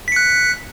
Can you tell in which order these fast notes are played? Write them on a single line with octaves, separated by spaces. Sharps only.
B6 C#7 F#6